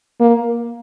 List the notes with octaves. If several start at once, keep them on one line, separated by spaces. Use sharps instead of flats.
A#3